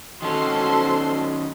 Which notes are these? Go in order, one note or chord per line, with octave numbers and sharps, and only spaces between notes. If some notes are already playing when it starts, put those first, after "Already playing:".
D#3 C#4 F#4 A4 C5 C6